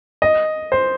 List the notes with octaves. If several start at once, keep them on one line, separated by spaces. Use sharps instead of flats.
D#5
C5